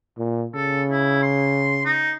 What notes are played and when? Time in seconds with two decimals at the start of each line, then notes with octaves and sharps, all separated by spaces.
0.18 A#2
0.55 C#3 A4
0.91 E4
1.23 C6
1.85 D#4